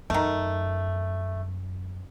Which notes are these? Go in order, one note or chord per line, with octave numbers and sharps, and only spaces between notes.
F#2 D#3 A3